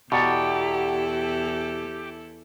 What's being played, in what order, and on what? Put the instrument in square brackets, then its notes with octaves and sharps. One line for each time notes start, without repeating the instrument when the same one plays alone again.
[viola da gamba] E2 E4 A4 [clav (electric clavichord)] B2 [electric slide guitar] G4 [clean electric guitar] D5 F#5 A#5